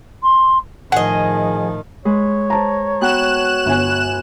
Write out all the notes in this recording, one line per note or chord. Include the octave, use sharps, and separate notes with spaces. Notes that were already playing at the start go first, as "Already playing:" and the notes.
C6
A2 D#3 F3 G#4 D#5 F#5
G#3 B4 C#5
C5 A5 A#5
B3 F#4 G5 F#6 E7
G1 G#5